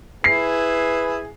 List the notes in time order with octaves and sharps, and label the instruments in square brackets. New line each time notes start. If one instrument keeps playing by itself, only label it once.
[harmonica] E4 G#4 [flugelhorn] B4 [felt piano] C7